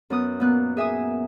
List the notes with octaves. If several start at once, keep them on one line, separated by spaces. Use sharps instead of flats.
F#2 B3 D#6 F#6
A#2 B3 F#6
G#4 E5 G#5 D#6